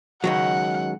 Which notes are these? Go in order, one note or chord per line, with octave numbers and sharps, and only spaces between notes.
C#2 D#3 F#3 F#5